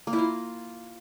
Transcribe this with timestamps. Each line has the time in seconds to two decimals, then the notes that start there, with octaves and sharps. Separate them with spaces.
0.07 A#3
0.13 E4
0.19 F4